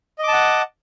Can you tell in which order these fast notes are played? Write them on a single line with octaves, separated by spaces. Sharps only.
D#5 D6 A5 F#5